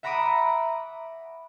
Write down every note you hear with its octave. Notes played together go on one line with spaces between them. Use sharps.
E5 F#5 A#5 B5 D6 D#6